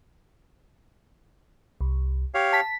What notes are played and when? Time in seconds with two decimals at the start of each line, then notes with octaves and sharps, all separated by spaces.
1.81 C2
2.34 G4 C#5 F5
2.53 A5 B6